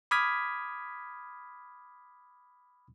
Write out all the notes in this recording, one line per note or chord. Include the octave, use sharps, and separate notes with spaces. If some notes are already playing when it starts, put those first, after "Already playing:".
B5 D6 D#6 F6 G#6 B6